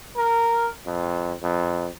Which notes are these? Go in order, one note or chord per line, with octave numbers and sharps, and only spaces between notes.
A#4
F2
F2